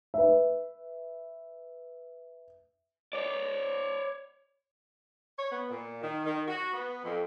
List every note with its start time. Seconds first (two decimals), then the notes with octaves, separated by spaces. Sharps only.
0.14 B4 E5
3.13 C#5 D5
5.39 C#5
5.52 B3
5.70 A#2
6.03 D#3
6.26 D#3
6.48 F#4
6.73 B3
7.04 F2